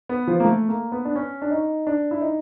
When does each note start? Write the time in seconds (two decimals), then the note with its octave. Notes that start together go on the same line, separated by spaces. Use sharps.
0.09 B3
0.27 F3
0.40 A#3
0.45 A3
0.69 A#3
0.92 B3
1.05 D4
1.16 C#4
1.42 D4
1.51 D#4
1.87 D4
2.11 E4
2.21 D#4